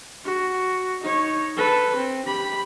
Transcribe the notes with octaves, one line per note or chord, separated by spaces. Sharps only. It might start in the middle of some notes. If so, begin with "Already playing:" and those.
F#4
D#4 C#5
A4 B4
C4
G4 B5